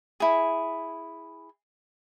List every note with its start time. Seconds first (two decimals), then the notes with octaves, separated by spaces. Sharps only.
0.20 E4 G#4